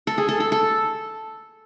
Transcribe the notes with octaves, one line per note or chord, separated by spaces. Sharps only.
A4
G#4
A4
A4
A4